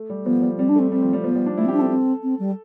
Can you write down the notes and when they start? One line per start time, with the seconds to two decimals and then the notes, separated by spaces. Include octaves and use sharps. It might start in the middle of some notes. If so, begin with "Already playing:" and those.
Already playing: A3
0.10 G3
0.26 F3 B3
0.42 G3
0.58 G3 C4
0.69 D4
0.75 A3 C4
0.92 G3 C4
1.02 F3
1.13 G3
1.24 F3 B3
1.35 G3
1.46 D4
1.57 A3 E4
1.65 C4
1.68 D4 G4
1.79 C4 A4
1.90 C4
2.23 C4
2.39 G3